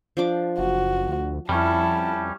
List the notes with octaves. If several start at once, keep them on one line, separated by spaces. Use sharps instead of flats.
F3 D4 D6
F#1 F#4
D2
F2 G3 C#4 E4 A5